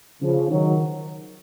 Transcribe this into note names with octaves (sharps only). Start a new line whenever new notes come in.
C#3 F3
D#3 F#3